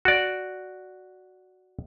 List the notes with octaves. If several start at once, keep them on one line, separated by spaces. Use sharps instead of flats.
F#4 D5